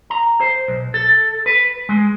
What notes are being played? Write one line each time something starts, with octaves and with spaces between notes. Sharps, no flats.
A#5
C5
B1
A4
B4
G#3